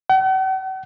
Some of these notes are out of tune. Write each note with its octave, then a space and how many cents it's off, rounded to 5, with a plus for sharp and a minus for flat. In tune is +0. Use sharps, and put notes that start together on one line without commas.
F#5 +45